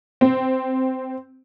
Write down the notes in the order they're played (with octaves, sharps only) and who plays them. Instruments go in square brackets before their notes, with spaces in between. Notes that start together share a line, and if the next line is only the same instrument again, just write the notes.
[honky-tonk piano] C4